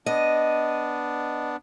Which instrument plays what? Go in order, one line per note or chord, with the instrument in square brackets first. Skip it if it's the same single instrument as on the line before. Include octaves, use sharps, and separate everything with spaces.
[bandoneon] B3 D4 [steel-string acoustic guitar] D#5